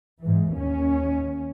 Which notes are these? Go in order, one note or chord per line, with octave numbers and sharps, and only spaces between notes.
G#2 E3
D#2 C#4